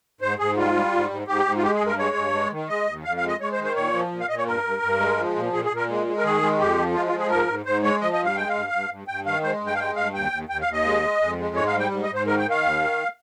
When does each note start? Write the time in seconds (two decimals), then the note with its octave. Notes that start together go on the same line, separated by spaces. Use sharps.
0.21 G#2 C5
0.39 G#2 G#4
0.56 G3 F4
0.74 G3
0.92 G#2
1.10 G#2
1.28 G#2 G4
1.45 G#2
1.57 F4
1.63 G#3 G4
1.75 G#4
1.81 G2
1.87 A#4
1.98 G#3 C#5
2.16 G2
2.34 G#3
2.51 D#3
2.69 G#3 D#5
2.87 D#2
3.04 F2 F5
3.17 F5
3.22 G#3
3.28 D#5
3.40 G#3 C#5
3.52 C5
3.58 D#3
3.64 C5
3.76 A#2 C#5
3.93 F3
4.11 A#2
4.20 F5
4.29 A#2 D#5
4.38 C#5
4.47 G2 A#4
4.64 G2
4.82 G2
5.00 G#3
5.18 F3
5.35 A#2
5.53 A#2 G#4
5.65 G#4
5.71 A#2
5.77 A#4
5.89 G#3
6.07 G#3
6.18 A#4
6.23 D#3 G#4
6.41 G#3
6.59 F2 G4
6.77 F3
6.94 G#3 F4
7.07 F4
7.13 F3
7.19 G#4
7.30 G#2 A#4
7.48 G#2
7.65 G#2 C5
7.83 G#3 C#5
8.01 F3 D#5
8.13 D#5
8.19 G2
8.25 F5
8.36 G#3 G5
8.48 F5
8.54 G2
8.72 G2
8.90 G2
9.08 G2 G5
9.25 D#3 F5
9.43 G#3 C5
9.61 G2
9.67 G5
9.74 F5
9.78 G#3 G5
9.96 G2 F5
10.14 D#2 G5
10.32 D#2
10.49 D#2 G5
10.61 F5
10.67 D#2
10.73 D#5
10.85 G#3
11.02 G#3
11.20 F2
11.38 G#3
11.56 G#2 C#5
11.67 F5
11.73 G3
11.79 G5
11.91 G#2
12.03 D#5
12.09 G#2
12.14 C5
12.27 D#3 A#4
12.38 G5
12.44 D#3
12.50 F5
12.62 D#2
12.80 D#3